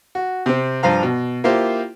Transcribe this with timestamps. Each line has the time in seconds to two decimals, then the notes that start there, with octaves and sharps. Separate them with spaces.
0.15 F#4
0.46 C3 C4
0.83 G2 F3 C5 F5 A#5
1.03 B2
1.44 A#3 E4 F4 G4 C5